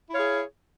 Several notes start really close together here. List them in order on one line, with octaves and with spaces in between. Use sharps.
E4 C#5 F5 G#4